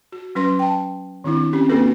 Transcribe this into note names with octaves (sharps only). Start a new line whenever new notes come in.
F#4
F#3 C#4 B4 C6
G5 A5
D#3 C4 D4 E4
C4 C#4 G4
A#3 C4 D4 F#4 A4 B4